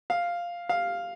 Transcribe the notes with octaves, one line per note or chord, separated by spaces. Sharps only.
F5
F5